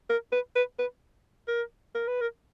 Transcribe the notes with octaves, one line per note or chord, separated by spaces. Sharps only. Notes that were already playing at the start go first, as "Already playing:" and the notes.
A#4
B4
B4
B4
A#4
A#4
B4
A#4